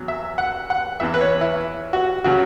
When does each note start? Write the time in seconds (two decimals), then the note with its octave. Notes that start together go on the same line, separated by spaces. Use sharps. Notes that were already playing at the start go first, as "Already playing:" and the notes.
Already playing: E2 F#3
0.08 E5
0.38 F#5
0.70 F#5
1.00 E2 E3 E5
1.14 B4
1.21 C#5
1.41 E4
1.93 F#4
2.24 C#3 F#3 F#4